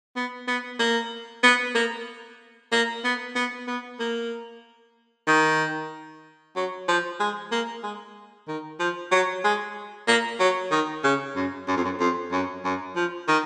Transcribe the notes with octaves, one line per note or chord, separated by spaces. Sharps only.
B3
B3
A#3
B3
A#3
A#3
B3
B3
B3
A#3
D#3
F#3
F3
G#3
A#3
G#3
D#3
F3
F#3
G#3
A#3
F#3
D#3
C#3
F#2
F#2
F2
F#2
F2
F#2
F#2
F3
D#3